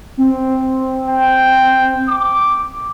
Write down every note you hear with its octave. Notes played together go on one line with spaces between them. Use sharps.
C4
G5
D6